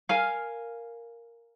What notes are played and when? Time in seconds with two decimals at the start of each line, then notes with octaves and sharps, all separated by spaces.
0.09 A#4 F5 G#5